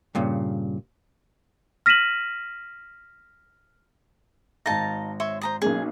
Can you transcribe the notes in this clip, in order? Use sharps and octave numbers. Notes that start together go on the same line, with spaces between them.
G2 A#2 C#3
F6 A#6 B6 D#7 E7 F#7
G#1 D#4 F5 A5 A#6
C#5 E5 C6
C5 A#5 D#6
B1 A#3 C#4 G#4